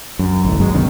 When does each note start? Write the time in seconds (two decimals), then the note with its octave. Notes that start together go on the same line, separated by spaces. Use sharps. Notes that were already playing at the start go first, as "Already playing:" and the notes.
0.19 F#2
0.45 A1 D2 A2
0.60 G#1 G2 F#3 G#3
0.74 B2 D#3 C#4